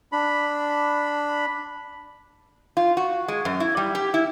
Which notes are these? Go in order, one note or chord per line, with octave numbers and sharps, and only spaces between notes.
D4 B5
F4
F#4
G#3
F#2
E4
G3
G4
E4